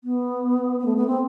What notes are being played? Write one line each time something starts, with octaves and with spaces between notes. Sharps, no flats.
B3
B3
A3
B3
C4